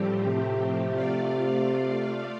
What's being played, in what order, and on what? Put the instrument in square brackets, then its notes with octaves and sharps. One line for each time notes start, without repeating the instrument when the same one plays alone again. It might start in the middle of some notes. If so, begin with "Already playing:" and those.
Already playing: [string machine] A2 F3 A3 C4 G4 [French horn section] G3
[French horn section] C3
[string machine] A3 F4 D5 F5